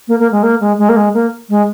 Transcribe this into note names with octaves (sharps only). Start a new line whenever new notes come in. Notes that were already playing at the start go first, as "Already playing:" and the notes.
A#3
A#3
G#3
A#3
G#3
G#3
A#3
G#3
A#3
G#3